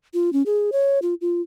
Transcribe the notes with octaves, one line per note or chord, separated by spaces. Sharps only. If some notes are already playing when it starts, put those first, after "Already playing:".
F4
C#4
G#4
C#5
F4
F4